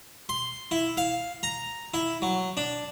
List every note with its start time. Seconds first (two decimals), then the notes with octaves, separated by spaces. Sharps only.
0.29 C6
0.71 E4
0.97 F5
1.43 A#5
1.94 E4
2.22 F#3
2.57 D4